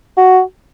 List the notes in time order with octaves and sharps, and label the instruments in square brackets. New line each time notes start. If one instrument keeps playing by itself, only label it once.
[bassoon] F#4